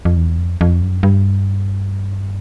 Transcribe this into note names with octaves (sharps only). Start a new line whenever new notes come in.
F2
E2
F2
F2
F#2
G2